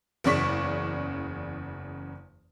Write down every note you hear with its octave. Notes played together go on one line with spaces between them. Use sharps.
F#1 E2 C#3 D5 C#6 B6